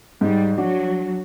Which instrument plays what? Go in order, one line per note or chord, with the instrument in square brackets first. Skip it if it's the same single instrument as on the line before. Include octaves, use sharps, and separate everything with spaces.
[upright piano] G#2 [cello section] G3
[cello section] F#3 [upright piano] D4 F#4